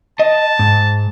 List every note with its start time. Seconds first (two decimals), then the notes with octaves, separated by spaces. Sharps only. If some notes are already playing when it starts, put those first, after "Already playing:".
0.20 D#5 A5
0.59 G#2